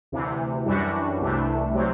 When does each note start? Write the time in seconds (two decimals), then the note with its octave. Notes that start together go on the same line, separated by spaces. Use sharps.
0.12 D2 C3 E3
0.66 F#2 E3 G3 D4 F#4
1.20 C2 C3 E3 A3 D4
1.75 C3 F#3 C4